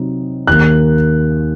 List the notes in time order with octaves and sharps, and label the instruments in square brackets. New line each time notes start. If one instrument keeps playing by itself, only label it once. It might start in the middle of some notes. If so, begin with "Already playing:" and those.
Already playing: [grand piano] C3 F#3 C4 D#4
D#2 D#3 A#3 F#6